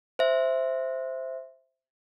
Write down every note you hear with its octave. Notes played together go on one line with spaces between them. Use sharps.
C5 E5